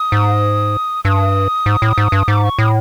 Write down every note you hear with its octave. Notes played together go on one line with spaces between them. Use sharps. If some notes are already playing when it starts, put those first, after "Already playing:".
Already playing: D#6
G#2
G2 D#6 E6
G#2
A2
G#2
G2
G#2 D6
C#6
A2 D#6